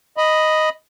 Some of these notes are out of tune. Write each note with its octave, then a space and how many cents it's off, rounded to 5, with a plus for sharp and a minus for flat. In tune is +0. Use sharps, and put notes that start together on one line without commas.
D#5 +0 B5 +0